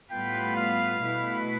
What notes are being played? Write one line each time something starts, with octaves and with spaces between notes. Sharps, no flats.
A2 G3 B3 F4 B4 G5
F5
B2 A3 E4 B4